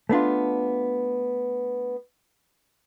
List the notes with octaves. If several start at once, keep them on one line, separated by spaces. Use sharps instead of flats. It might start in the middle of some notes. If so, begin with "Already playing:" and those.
A3 B3 D4 F4